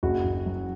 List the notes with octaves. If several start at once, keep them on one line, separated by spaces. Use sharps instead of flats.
F#1 F#4
F#1
F#2